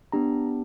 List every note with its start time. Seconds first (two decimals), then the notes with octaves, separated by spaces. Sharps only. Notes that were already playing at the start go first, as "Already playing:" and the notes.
0.12 B3 D4 G4 A#5